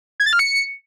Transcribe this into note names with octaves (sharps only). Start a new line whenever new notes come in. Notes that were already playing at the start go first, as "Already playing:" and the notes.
G#6
A6
F6
C#7